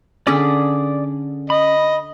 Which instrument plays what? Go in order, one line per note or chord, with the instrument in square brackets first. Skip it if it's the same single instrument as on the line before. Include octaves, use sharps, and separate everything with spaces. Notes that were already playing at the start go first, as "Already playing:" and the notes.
[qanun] D3 G#4 B5 [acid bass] C#4 [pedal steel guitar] D5 D6 D#6
[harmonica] D#5 [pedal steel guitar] B5